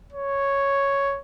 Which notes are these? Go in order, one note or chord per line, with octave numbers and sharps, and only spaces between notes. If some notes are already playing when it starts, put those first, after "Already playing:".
C#5